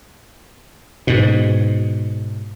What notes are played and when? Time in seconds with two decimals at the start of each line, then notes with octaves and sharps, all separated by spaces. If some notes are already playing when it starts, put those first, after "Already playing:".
1.07 G#2 B2